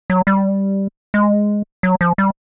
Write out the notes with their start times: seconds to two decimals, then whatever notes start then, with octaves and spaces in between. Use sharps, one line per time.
0.10 F#3
0.27 G3
1.14 G#3
1.83 F#3
2.01 F3
2.18 G3